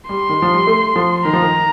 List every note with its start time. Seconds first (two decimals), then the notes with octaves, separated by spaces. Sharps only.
0.09 G3 C6
0.29 D#3
0.42 F3
0.54 G3
0.67 A3
0.96 F3
1.25 D#3 A#5
1.33 F3
1.42 D#3